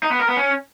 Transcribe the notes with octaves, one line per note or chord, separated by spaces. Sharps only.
D#4
B3
A#4
B3
C#4